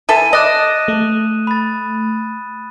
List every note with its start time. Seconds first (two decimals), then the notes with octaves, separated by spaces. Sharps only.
0.09 E3 A4 E5 D#7
0.33 D#5 A5 D6 D#6 F#6 A#6 E7
0.88 A3
1.47 B5 A6